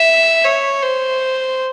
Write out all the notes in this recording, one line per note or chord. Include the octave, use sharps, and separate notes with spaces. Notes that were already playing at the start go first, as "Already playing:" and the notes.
Already playing: E5
C#5
C5